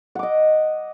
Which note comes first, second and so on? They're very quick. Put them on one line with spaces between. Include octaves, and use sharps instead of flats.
F#5 D6 D#5